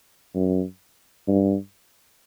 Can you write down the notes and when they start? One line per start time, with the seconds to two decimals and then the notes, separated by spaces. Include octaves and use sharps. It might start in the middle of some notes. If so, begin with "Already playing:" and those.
0.35 F#2
1.28 G2